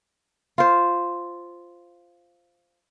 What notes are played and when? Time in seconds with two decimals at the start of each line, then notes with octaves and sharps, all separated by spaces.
0.58 F4 C5